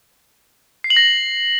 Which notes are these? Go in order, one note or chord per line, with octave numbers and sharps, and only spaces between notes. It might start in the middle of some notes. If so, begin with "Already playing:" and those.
C7
F#7
A#6